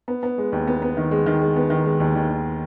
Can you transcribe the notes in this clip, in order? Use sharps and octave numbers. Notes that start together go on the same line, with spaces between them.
B3
B3
G#3
D#2
B3
B3
D#3
G#3
D#3
G#3
B3
D#3
G#3
D#2
D#2
D#2